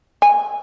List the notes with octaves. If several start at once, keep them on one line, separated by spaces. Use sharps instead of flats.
G#5